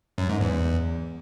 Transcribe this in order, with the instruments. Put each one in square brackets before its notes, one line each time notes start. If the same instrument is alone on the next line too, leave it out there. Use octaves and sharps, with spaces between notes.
[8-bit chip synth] F#2
G#2
E2